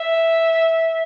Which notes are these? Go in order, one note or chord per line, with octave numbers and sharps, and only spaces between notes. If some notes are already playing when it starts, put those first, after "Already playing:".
Already playing: E5